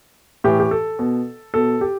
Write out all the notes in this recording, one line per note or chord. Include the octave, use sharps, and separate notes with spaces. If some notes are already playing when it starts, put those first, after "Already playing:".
A2 E3 G4
G4
A4
B2
B2 A4
G4